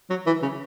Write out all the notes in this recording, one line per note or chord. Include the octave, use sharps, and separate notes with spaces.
F#3
E3
C#3